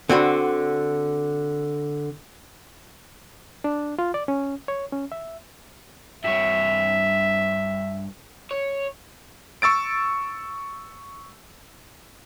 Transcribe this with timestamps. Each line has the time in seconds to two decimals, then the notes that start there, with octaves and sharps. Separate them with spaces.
0.09 D3 C4 F#4 B5
3.64 D4
3.99 F4
4.14 D5
4.28 C#4
4.68 C#5
4.92 C#4
5.12 E5
6.24 G2 C#5 E5
8.51 C#5
9.62 C#6 E6 A6 D7